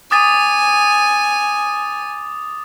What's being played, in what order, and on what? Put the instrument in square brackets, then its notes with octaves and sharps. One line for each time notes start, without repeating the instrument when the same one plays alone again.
[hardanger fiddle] G#5 [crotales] D6 D#6 A6